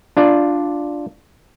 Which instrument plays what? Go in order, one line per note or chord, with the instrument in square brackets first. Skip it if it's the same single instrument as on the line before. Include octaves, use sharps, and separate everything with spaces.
[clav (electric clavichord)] D4 F4 D5